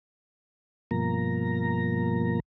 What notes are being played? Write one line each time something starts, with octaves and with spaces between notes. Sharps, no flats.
G2 B2 F3 A#3 A#5